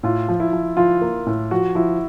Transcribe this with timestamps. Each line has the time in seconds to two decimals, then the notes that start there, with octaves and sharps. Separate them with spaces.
0.03 A2 F4
0.29 F3
0.40 E4
0.53 F3
0.77 F3 F4
1.01 A#3
1.26 A2
1.51 F3 F#4
1.75 F3 E4